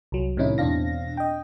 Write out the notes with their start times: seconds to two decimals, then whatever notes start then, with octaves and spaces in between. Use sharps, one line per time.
0.12 C2 F#3
0.37 A2 C3 D#3 C#4 D#4 E4
0.58 E2 B2 C4 D4 F5 A#6
1.17 D#5 G5